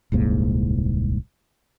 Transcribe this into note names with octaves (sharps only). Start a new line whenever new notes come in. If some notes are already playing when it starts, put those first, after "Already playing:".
D#1 C2 G#2 A#3